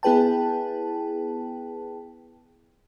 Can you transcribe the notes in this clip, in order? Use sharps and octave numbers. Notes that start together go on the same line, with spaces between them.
B3 E4 G#4 B4 G5 A5